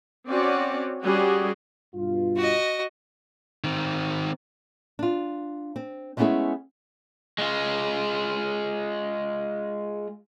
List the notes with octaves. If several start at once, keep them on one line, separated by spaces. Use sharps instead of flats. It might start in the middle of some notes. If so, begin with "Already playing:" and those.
C4 C#4 F#4 D5
G3 C#4 F#4 G#4
G2 B2 F4
F#4 D#5
D#3 C4
D4 F4
C4
G#3 A3 B3 C#4 E4 G#4
G#3 F4